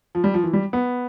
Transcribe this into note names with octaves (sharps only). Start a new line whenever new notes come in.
F3
G3
F3
E3
G3
B3